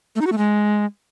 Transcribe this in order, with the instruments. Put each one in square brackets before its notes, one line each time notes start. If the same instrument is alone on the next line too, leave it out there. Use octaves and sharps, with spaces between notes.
[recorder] A3
D#4
F#4
A3
G#3